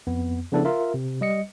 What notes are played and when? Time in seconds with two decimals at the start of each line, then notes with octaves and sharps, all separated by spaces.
0.07 F2 B3
0.52 C#3 F3 B3 D4 E4 A4
0.65 F4 A#4 E5
0.94 C3
1.21 G3 D#5 C#7